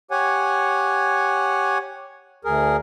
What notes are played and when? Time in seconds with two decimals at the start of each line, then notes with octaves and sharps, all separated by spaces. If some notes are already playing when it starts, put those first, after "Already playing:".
0.11 G4 C#5 F#5 G#5
2.45 D2 G#4 A#4